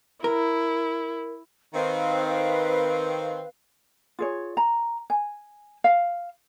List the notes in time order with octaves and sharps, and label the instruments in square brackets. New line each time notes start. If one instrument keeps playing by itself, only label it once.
[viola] E4 [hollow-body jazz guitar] A#4
[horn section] D#3 C4 [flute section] B4 F5
[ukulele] F4 G#4 C#5
A#5
G#5
F5